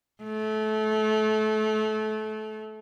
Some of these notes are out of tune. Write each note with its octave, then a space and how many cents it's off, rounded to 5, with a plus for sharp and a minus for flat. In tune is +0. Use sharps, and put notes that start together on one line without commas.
A3 -25